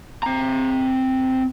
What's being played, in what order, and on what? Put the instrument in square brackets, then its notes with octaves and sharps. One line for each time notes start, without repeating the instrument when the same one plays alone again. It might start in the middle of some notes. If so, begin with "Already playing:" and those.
[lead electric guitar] C4 A#5